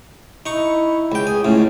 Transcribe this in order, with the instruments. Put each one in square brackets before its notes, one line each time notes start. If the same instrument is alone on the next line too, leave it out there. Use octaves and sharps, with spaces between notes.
[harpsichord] D#4 C#6 [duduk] E4
[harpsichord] C#2 G5
[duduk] G#4 [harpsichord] G#5
[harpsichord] C#2 A2 [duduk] C#4